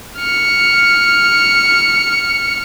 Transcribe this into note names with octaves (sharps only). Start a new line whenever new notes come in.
F6 C#7